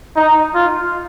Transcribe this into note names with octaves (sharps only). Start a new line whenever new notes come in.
D#4
F4